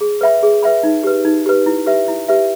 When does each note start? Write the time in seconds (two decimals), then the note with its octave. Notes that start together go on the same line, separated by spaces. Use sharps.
0.01 G#4
0.21 B4 E5 G5 B5
0.43 G#4
0.63 B4 E5 G5 B5
0.83 D#4
1.04 G4 B4
1.25 D#4
1.46 G4 B4
1.66 E4
1.86 G4 B4 E5
2.08 E4
2.28 G4 B4 E5